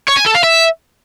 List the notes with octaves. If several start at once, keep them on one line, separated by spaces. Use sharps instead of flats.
C#5
G#5
A4
F5
E5